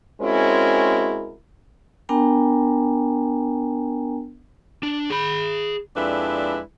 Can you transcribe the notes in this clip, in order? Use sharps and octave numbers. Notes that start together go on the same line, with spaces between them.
G#3 C4 C#4 E4 F#4 A#4
B3 D4 A#4 G5 G#5 A#5
D4
G#4 B5
F2 G#3 D4 E4 B4 D5